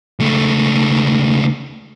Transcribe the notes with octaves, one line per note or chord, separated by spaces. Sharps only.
C#2 A3